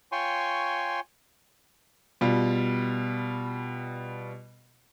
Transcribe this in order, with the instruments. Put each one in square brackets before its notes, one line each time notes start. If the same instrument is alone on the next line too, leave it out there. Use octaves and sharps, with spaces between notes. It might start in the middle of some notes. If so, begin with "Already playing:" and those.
[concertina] F4 C#5 G5 G#5 C6 C#6
[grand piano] B2 G3 F4